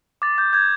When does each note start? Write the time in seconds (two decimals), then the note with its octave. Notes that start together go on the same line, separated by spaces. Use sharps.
0.22 D6 A6
0.38 D6 G6
0.53 G6 G#6